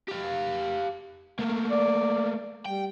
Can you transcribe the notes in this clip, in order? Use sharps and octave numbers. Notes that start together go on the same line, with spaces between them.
G4 F5
A3 A#3
D5
G3 G5